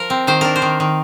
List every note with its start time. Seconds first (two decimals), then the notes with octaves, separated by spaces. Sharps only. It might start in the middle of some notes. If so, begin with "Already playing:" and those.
Already playing: F3 A#4
0.10 C4
0.27 D#3 C5
0.41 D4 A#4
0.56 C5
0.62 D#3
0.80 D#3